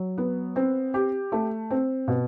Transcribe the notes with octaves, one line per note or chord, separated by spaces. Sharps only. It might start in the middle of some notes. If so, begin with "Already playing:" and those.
Already playing: F#3
B3
C4
G4
A3
C4
B2